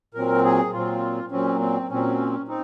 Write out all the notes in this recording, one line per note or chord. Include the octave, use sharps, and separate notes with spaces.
A#2 F#3 C4 A#4
G#4
A#2 F#3 C4 F4
A#2 F#3 C4 C#4
C4
A#2 F#3 C4 C#4
C4 D#4